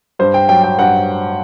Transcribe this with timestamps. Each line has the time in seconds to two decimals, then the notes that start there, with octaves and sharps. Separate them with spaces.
0.19 G2 C5
0.34 G5
0.49 F#3 G5
0.63 G5
0.78 G2 F#5